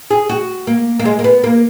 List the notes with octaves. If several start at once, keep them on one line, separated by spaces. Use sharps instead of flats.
G#4
F#4
A#3
A#3
G#3
A#3
B3
A#3